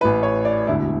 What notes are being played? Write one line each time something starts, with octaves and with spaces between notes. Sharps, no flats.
A1 A2 E3 B4
C#5
D5
E1 D2 D3 E4